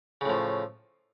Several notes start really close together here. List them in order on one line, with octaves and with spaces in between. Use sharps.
C#3 A2 F3